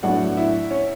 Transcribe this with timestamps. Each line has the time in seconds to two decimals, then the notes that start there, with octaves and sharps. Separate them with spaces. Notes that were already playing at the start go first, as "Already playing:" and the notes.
0.03 A2 F#3 B3 D4 F#4 F#5
0.37 E4 E5
0.71 C#4 C#5